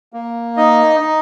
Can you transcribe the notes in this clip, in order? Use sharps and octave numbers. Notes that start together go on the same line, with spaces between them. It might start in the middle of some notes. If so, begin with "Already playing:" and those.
A#3
D#4 D#5
D#4